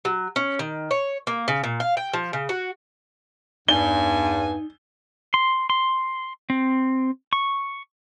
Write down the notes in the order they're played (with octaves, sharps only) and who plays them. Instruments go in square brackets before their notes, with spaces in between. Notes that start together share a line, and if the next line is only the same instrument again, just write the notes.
[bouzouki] F#3
C#4
D#3
C#5
A#3
C#3
A#2
F5
G5
F3
C#3
F#4
[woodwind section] E2 G2 [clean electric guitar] D#4 D5 [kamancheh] G#5 [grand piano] G7
[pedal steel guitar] C6
C6
C4
C#6